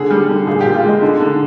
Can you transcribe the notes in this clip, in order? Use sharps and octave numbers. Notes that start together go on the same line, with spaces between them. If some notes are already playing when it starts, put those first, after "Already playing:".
Already playing: D3 G#4
G3
D3
A#2 G#4
G4
A#2
F4
G#3 D#5
D3
D3